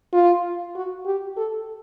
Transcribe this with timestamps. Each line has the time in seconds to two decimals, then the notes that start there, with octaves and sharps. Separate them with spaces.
0.13 F4
0.75 F#4
1.06 G4
1.37 A4